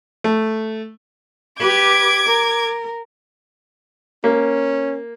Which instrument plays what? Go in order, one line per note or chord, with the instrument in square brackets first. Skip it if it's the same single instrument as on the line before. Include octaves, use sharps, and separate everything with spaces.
[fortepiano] A3
[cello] G4 B4 [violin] D6 G#6
[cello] A#4
[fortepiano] A#3 [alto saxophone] C#4